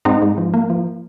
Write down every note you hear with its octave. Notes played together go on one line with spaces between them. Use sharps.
G#2 C4 D#4
G#2
F3
A#3
F3